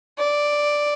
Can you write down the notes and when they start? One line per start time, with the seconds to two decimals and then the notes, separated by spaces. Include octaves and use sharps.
0.18 D5